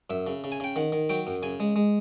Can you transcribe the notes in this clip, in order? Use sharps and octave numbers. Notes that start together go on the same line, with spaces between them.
F#2 E5
C#3
C#3
G#5
C#3 G5
D#3 F#5
D#3
F#3 G5
F#2
C#3 G#5
G#3
G#3